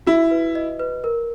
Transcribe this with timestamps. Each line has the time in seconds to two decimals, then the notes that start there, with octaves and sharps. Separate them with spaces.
0.07 E4 F#4
0.31 B4
0.55 D#5
0.79 B4
1.04 A#4